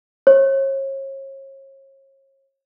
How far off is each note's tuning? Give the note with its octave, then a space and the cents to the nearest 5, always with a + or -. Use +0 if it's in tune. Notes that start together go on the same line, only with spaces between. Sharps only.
C#5 -40